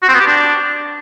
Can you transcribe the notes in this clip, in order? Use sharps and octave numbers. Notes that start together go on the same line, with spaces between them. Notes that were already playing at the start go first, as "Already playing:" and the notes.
F#4
C4
B3
G4
D4